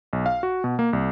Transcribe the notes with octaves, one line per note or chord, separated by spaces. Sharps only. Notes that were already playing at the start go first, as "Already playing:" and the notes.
B1
F5
F#4
B2
A#3
C2